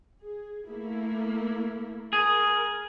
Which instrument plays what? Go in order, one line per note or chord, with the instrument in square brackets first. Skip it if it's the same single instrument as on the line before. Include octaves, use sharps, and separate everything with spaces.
[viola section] G#4
A3 A#3 E4
[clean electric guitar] G#4 [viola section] A#4